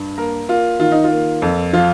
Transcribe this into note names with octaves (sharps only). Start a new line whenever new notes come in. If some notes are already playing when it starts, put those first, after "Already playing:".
Already playing: G2
A#3 A#4
A#3 F4
D#3 F4
D#4
F4
A#3
F2
F3 F4